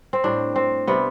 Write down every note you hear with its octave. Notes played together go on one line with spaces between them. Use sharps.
C4
A2 G3 D4
C4
C3 G3 B3